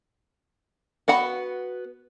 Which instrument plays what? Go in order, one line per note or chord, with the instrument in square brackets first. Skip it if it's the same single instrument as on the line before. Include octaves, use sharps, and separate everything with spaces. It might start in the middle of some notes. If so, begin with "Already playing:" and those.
[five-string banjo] B3 F#4 F#5 B5